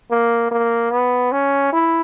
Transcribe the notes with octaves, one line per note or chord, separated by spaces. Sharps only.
A#3
A#3
B3
C#4
E4